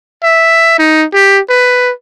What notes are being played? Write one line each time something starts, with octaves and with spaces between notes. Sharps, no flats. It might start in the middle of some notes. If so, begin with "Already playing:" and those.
E5
D#4
G4
B4